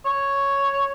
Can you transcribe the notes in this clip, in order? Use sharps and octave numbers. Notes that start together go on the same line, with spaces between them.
C#5